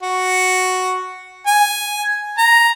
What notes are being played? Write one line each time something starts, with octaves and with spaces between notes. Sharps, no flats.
F#4
G#5
A#5